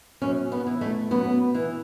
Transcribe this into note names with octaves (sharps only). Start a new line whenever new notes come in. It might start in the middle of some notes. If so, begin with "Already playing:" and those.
F#2 C#4
B3
E3
A3
F#2 B3
E3